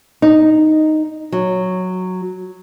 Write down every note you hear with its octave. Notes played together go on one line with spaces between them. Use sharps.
D#4
F#3